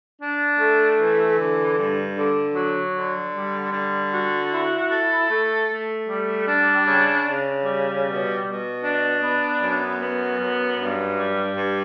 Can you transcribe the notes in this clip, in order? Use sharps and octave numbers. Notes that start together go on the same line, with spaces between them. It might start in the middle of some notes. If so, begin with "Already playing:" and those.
D4
A3
E3
D3
G2
D3
F#3
D3
G3
D3
F#4
E4
A4
A3
A3
G3
D4
C#3
C#3
G3
B2
B2
D4
B3
F#2
B3
F#2
G2
G3
G2